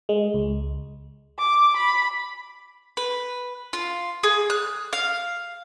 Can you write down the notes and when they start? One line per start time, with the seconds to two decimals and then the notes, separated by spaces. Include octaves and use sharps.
0.09 G#3
0.34 C#2
1.39 D6
1.77 B5
2.97 B4
3.73 F4
4.23 G#4
4.50 F#6
4.93 F5